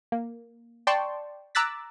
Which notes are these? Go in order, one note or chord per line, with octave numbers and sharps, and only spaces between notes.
A#3
D5 G5 A5 C6 C#6
A#5 D6 E6 F#6 A6 B6